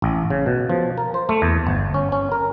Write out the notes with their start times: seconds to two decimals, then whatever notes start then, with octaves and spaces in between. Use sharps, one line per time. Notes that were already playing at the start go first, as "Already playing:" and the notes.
0.02 A1
0.30 C#3
0.46 B2
0.70 F3
0.98 A#4
1.14 C5
1.29 A3
1.42 E2
1.67 G1
1.94 C#4
2.12 C#4
2.32 A#4